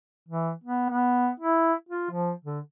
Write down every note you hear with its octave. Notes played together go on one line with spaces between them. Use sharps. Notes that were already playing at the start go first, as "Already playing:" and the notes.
E3
B3
B3
E4
F4
F3
D3